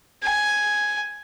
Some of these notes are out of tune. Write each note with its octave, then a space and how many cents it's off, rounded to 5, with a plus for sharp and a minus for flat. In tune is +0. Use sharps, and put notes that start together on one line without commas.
G#5 +5